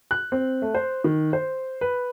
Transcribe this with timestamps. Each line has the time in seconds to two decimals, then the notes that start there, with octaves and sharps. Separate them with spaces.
0.11 F#6
0.32 C4
0.62 A3
0.75 C5
1.04 D#3
1.33 C5
1.81 B4